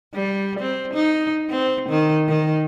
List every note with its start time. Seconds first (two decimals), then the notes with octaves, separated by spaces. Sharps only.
0.14 G3
0.59 C4
0.94 D#4
1.50 C4
1.89 D#3
2.28 D#3